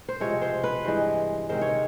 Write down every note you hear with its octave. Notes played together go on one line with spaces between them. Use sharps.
C5
C3 F3 G#3 C#5
C5
B4
G2 E3 G#3 C5
C3 D#3 G#3 C5
C#5